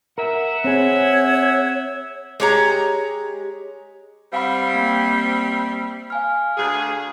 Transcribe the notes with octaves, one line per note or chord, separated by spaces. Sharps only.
A#4 E5 F#5
C4 G#4 C#5
G#3 G4 C#5 A#5
G3 C4 F5 F#5 B5
A#3
F5 G#5 F6
D2 G#4